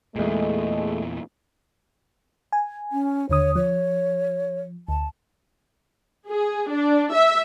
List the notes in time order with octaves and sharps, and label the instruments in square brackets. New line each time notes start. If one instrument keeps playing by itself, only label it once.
[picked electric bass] E2 A#2 [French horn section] G#3 A3
[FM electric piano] G#5
[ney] C#4
[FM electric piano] D#2 D3 D#6 [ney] C#5
[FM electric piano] F3 [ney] C#5
[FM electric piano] D2 [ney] A5
[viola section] G#4
D4
E5